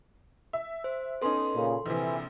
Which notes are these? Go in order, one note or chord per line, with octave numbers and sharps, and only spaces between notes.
E5
C5
B3 C#4 D#4 A4 C6
A#2 C#3
A#1 C3 E3